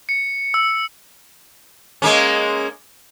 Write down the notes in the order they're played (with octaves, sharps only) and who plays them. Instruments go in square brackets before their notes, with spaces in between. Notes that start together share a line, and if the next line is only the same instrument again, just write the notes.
[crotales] C#7
E6
[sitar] G#3 A#3 C#4